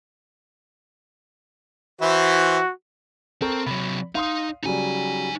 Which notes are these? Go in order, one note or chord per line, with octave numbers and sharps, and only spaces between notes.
E3 E4 F#4 C5
C4 A4 A#4 C#6
C3 F#3 B5
D#4 F5 C6 D#6
C#3 F#3 G3 D#4 G#5